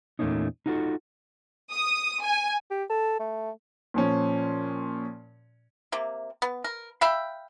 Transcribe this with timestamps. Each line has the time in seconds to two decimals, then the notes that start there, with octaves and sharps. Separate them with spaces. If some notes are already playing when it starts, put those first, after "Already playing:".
0.19 E2 A#2 A3 A#3 C#4 D#4
0.66 D#4 F4 F#4 G#4 A4
1.73 D#6
2.24 G#5
2.71 G4
2.89 A4
3.20 A3
3.94 A#2 F3 C#4
5.92 C3 A#3
6.42 B3
6.64 A#4
7.01 E5 F5 G5 B5